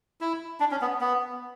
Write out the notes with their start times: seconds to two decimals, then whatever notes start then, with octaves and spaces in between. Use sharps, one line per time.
0.21 E4
0.60 D4
0.71 C#4
0.81 B3
1.01 B3